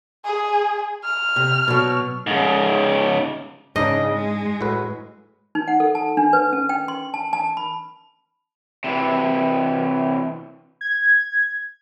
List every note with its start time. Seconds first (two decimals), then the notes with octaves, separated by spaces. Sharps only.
0.25 G#4
1.04 F6
1.36 C3
1.68 B2 F#3
2.27 G#2 C#3
3.76 G#2 C#3 D4 D#4 D#5
4.14 G#3
4.61 A2 F#4 B4
5.55 D#4
5.68 F#5
5.80 A4
5.95 A5
6.17 D4
6.33 B4
6.53 C#4
6.69 G5
6.88 C6
7.14 A5
7.33 A5
7.57 B5
8.84 C3 E3
10.81 G#6